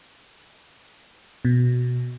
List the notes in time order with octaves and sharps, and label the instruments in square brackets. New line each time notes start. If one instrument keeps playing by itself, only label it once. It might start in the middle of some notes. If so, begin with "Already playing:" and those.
[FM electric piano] B2